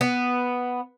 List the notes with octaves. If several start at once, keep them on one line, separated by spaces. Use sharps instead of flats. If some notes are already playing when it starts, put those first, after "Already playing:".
B3